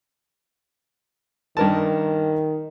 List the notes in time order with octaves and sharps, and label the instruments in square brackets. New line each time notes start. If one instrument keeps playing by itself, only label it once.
[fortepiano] G2 A#4 A5 [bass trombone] D#3